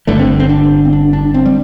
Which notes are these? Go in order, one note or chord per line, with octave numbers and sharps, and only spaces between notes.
G1 G2 D3 A3
C4
C4
D4
C4
D4
D4
C4
G3